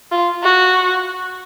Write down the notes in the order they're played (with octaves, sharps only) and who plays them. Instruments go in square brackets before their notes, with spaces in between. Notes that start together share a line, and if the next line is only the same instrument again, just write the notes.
[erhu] F4
F#4